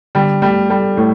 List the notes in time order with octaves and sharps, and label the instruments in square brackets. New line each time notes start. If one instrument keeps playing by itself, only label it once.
[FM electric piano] D3 [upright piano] G3
[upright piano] G3 [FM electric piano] A3
[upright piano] G3 [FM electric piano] A4
[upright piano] A2 [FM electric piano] A3